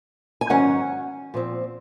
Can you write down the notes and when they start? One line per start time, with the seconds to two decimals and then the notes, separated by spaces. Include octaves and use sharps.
0.41 G#5
0.49 G#2 D#3 F#3 C#4 F#5
1.34 A#2 F3 C4